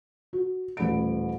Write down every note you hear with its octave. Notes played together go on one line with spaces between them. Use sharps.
F#4
D#1 A1 B5 D7